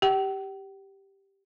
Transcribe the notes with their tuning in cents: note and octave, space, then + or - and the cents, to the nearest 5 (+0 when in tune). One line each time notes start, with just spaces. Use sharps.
G4 +0 G5 -45